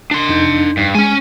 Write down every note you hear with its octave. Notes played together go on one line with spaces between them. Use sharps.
D4 C6
F2 D#4 G6
G2
G#3 C#4 G#5